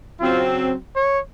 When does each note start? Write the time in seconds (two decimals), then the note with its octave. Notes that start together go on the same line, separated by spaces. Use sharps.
0.20 C#3 F#3 C4 F4
0.96 C#5